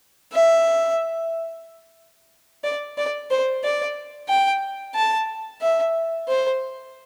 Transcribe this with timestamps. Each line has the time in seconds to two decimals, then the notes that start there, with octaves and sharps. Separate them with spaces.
0.33 E5
2.64 D5
2.98 D5
3.31 C5
3.64 D5
4.29 G5
4.95 A5
5.61 E5
6.28 C5